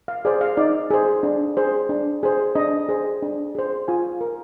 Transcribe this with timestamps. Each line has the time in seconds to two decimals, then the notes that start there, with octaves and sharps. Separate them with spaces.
0.08 F5
0.25 G#4 C5 D5
0.41 F5
0.57 D#4 D5
0.90 G#4 C5
1.23 D4
1.57 G#4 C5
1.89 D4
2.23 G#4 C5
2.55 D4 D#5
2.89 G#4 C5
3.22 D4
3.55 G#4 C5
3.88 F4 G#5
4.21 A#4